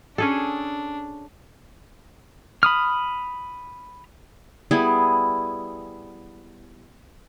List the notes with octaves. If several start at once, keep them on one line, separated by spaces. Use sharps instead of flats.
C#4 D4 G#4 A4
B5 D#6 F6
G3 B3 E4 G#4